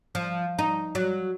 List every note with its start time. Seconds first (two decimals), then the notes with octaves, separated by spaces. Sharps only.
0.15 F3
0.59 D#4
0.95 F#3